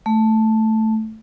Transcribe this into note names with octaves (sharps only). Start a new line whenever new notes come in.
A3